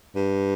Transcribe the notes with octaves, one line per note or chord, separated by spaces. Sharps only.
G2